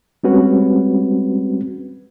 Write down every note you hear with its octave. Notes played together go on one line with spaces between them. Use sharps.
G3 G#3 C4 C#4 F#4 B4